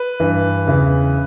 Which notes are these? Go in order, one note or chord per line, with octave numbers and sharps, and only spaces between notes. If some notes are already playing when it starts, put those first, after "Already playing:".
Already playing: B4
G2 E3
E2 C#3 E3